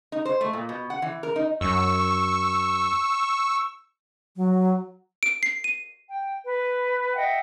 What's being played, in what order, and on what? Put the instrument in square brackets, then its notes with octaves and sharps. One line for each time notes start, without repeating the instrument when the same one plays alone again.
[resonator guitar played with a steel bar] D#4
C5
A3
A#2
B2
F#5
E3
A#4
D#4
[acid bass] F#2 [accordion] C#6 E6
[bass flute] F#3
[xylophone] D7
C7
D#7
[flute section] G5
B4
D#5 E5 F#5 G5